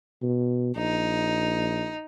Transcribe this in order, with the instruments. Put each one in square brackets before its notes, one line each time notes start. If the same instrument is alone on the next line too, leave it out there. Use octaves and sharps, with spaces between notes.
[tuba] B2
[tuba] A#1 [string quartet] D#4